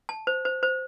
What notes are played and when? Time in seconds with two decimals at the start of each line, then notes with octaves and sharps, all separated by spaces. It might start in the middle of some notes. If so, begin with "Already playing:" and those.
0.09 A5
0.27 C5
0.45 C5
0.63 C5